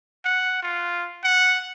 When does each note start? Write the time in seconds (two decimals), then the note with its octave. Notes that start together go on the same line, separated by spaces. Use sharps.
0.25 F#5
0.63 F4
1.24 F#5